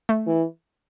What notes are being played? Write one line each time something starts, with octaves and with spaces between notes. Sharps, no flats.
A3
E3